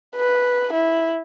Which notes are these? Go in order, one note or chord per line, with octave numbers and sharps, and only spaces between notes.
B4
E4